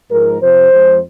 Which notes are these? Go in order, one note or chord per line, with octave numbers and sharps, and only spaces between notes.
G#2 F3 G#3 A#4
F2 C3 F3 C5
F2 F3 G#3